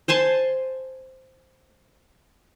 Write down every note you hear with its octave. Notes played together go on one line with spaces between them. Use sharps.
C5 G#5 A5 C6